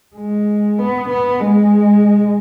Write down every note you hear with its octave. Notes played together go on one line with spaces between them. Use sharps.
G#3
B3
B3
G#3